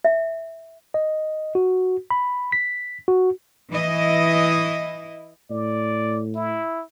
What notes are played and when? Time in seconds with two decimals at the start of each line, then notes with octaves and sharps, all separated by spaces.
0.05 E5
0.94 D#5
1.55 F#4
2.11 B5
2.52 B6
3.08 F#4
3.71 E3 E4 D#5
5.50 A2 D5
6.35 E4